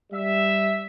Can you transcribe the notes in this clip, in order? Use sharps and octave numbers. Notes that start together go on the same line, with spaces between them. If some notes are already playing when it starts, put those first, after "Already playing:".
G3 E5